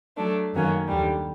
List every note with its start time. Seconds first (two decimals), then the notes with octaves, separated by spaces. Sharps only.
0.17 F#3 A3 D4
0.53 F#2 D#3 F#3 A#3 C#4
0.88 D#2 D3 G3